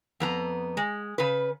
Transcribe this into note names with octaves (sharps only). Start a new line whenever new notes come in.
F2 B3 A#5
G#3
C#3 B4